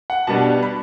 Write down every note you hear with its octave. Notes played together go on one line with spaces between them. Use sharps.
F#5
B2 G3 B3 D4 A5
B5